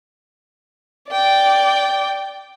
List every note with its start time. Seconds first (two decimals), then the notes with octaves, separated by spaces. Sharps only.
1.10 D5 G5